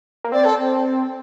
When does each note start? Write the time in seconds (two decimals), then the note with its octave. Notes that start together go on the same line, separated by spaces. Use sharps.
0.24 A#3
0.32 C4 D5
0.44 A4